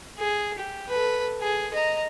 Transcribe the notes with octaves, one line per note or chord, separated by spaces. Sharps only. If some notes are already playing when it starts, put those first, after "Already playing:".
G#4
G4
A4 B4
G#4
D#5 A#5